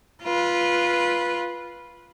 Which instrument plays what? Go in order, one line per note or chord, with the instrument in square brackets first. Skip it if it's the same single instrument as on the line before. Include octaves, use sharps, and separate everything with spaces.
[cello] F4 B4